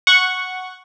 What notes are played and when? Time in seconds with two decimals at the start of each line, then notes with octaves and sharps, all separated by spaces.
0.07 F#5 C#6